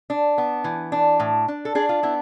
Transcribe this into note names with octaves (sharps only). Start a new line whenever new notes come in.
D4
B3
E3
D4
A2
D4
A4
D4 G#4
F4
B3 E4